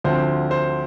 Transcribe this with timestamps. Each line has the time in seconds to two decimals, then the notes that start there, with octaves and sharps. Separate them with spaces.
0.04 D2 D3 F3 C4 C5
0.51 C5